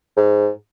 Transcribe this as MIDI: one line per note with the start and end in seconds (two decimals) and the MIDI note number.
0.17 0.49 44